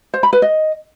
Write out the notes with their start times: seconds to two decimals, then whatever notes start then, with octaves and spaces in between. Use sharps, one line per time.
0.14 C5
0.23 B5
0.33 B4
0.42 D#5